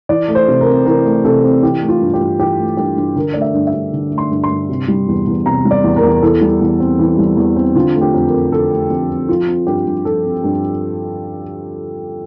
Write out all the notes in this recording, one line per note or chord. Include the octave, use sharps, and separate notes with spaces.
E3 D5
A3
C5
C3
A#4
C4
E3 A#4
A3
C3 A4
C4
E3 G4
A3
F4
G2
G4
G2
E3 G4
A3
G2 G4
G2
D3 A#4
A3 D5
E5
G2
E5
G2
D3
A3
C6
G2
C6
G2
C3
G3
E2
E2
C3 A#5
G3
D5
E2
A#4
E2
E3 A4
G3
E2
C4
E3
G3
E2
C4
D3 F4
A3
G4
F2
A#4
C4
D3 A4
A3
F2
C4
F3 F4
C4
G2 G4
G2
F3 A4
C4
G2